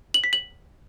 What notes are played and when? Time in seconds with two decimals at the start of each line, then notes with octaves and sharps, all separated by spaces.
0.14 F#7
0.24 B6
0.33 F#7